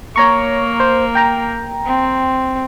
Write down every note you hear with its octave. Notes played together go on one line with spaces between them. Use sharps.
A#3 C#5 A#5 C#6
C5
G5 A#5
C4